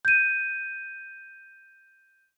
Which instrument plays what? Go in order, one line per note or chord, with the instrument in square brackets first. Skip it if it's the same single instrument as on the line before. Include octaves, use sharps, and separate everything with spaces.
[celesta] G6 D#7